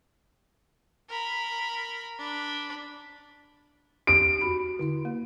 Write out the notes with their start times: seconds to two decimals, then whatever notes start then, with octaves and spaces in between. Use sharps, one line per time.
1.09 A#4 B5
2.19 D4 B5
4.07 G4 D7
4.41 F#4 B5
4.79 D3 E4
5.05 A#3